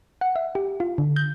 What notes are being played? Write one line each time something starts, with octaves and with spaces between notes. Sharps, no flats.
F#5
E5
G4
F4
D3
G6